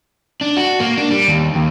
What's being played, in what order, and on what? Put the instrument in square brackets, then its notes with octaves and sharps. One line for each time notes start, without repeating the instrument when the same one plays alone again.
[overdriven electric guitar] D4
F#4
A#3
D4
G3
D#2
D#2